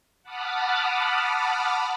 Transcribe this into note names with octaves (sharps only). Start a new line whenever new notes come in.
F#5 A5 B5 D6 D#6 F6